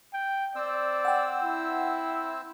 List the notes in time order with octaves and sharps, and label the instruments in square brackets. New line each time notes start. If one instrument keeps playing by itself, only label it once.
[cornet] G5
[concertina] C4 C5 E6 [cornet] D5
[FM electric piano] F#5 G5
[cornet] E4